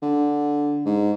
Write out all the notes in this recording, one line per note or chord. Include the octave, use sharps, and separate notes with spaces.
D3
G#2